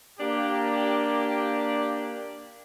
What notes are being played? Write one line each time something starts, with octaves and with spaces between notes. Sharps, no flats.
A#3 D4 G4